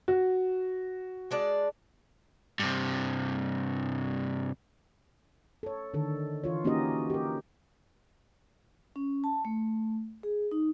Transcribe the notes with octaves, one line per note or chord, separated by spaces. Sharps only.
F#4
G#3 D4 D5
G2 C3
A4 C#5
D3 D#3 A4
E3 F4 C#5
A#3 C#4 D#4 F#4 G4 D#5
G4 A#4
C#4
A5
A3
G#4
D#4